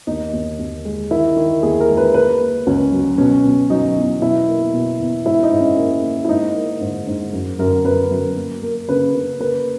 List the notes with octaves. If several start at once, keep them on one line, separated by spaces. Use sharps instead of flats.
D#2 D#4
D#2
D#2
G#3
D#3 E4
D#3
D#2 G#4
A#4
G#3
B4
A#3 B4
A#3
C#2 C#4
F#3
B2 C#4
B2
F#3 D#4
E2
B2 E4
A#3
B2
E2
G#2 E4
D#4
G#2
C#4
A#3
A#3
E4
G#2 D#4
A#3
G#2
G#2
F#2
F#2 A#4
F#2 B4
F#2
A#3
A#3
C#3 B4
C#3
A#3 B4